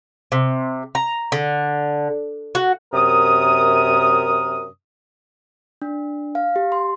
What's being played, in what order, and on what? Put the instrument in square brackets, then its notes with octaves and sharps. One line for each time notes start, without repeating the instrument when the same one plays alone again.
[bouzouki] C3
A#5
D3
F#4
[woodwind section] F#2 C3 A#4 D#6
[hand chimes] D4
F5
G4
C6